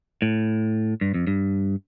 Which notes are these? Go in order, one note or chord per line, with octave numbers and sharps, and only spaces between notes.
A2
G2
F2
G2